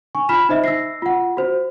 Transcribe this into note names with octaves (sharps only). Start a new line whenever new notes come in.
G#5 C#6
F4 B5 F6 B6 E7
D#4 C5 D#5 E5
E6 A#6 C7
F4 F#5
F#4 C5